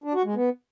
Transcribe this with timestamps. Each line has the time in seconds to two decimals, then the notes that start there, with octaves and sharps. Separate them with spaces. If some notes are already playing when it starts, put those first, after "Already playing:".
0.04 D4
0.14 F#4
0.25 G#3
0.35 B3